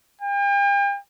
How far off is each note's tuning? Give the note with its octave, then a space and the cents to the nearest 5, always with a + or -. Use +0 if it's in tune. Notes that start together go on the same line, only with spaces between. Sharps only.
G5 +40